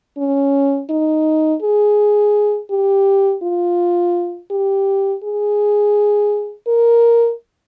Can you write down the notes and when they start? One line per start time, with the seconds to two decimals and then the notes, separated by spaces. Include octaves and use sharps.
0.18 C#4
0.90 D#4
1.62 G#4
2.71 G4
3.43 F4
4.51 G4
5.24 G#4
6.68 A#4